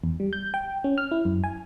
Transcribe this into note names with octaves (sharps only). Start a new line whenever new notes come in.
E2
G3
G6
G5
C#4
F6
E4
F#2
G#5